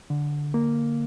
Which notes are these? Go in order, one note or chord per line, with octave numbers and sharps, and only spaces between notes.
D3
A#3